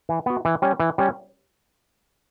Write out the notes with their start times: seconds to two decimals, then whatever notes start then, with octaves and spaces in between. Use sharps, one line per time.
0.09 E3
0.26 B3 F#4
0.45 E3
0.62 G3 C#4
0.80 E3
0.98 G3 C#4